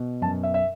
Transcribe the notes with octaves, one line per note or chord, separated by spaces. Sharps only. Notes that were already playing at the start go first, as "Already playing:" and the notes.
Already playing: B2
F#2 A5
E5
E5